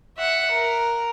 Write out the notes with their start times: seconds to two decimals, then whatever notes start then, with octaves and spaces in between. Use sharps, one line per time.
0.17 E5 F#5
0.51 A#4